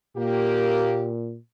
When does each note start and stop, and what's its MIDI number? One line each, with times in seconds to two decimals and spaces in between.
0.17 1.38 46
0.17 1.11 58
0.17 1.11 67